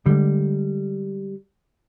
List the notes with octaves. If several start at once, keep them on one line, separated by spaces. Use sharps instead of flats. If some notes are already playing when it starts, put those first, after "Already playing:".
D3 G3 G#3